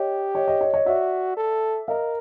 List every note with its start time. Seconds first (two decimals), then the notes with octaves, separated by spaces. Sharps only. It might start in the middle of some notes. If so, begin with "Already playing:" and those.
Already playing: G4 C#5 D#5
0.35 C#5 D#5
0.48 C#5 D#5
0.61 C#5 D#5
0.74 C#5 D#5
0.86 F#4 D5 E5
1.37 A4
1.88 A#4 D#5 F5